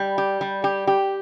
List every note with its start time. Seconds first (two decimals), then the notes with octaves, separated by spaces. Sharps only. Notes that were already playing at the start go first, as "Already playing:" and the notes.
Already playing: G3
0.18 G4
0.41 G3
0.64 G4
0.87 G4